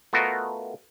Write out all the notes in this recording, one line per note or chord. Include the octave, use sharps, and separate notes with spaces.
A3 B3 F4 F#4 A#4 D#5